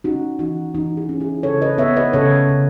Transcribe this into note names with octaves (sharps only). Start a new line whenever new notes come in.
C#4 D#4 F#4
E3 D#4 F#4
E3 D#4 F#4
E4 G#4
C#4
E4 G#4
C#3 A4 C#5
B4 D#5
B3 C#5 E5
B4 D#5
C#3 A4 C#5
C#3